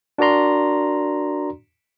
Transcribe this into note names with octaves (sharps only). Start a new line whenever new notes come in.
D4 F#4 A#4 D5 A#5 C6